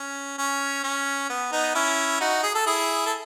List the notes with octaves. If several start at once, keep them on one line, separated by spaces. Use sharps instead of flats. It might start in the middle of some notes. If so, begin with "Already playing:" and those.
Already playing: C#4
C#4
C#4
B3
B3 D#4
C#4 E4
D#4 F#4
G#4
A4
E4 G#4
A4